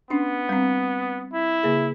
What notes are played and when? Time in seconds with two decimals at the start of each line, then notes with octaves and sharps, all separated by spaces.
0.10 B3 C#4 D4
0.49 G3 C4
1.33 E4
1.63 C#3 A#3 G#4